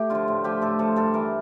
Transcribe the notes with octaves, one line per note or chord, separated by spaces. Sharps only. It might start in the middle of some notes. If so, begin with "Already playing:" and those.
Already playing: A3 G4
D3 F3 F4
A2
F3 G4
A2 A4
F3 A4
G2 A4
E3 A#4